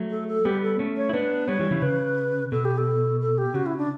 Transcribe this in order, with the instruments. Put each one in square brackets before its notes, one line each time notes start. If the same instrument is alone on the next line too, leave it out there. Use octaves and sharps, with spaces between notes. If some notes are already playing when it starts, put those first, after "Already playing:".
Already playing: [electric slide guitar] F#3 A3
[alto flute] A4
A4
[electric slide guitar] G3 B3 [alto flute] G4
[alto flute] A4
[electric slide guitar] A3 C#4
[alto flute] C#5
[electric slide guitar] E4
[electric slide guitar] B3 D4 [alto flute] B4
[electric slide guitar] G3 B3 [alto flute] C#5
[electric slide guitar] E3 G3
C#3 E3
[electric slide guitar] C#3 [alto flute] B4
[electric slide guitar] B2 [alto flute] A4
[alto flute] G4
A4
A4
G4
[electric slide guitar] C#3 [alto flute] F#4
[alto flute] E4
D4